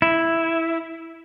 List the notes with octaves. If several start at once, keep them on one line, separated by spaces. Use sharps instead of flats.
E4